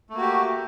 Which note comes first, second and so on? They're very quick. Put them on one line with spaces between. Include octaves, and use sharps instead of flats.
A3 A#3 F#4 G4